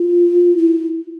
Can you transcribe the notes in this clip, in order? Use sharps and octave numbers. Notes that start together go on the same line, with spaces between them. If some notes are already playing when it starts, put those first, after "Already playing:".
Already playing: F4
E4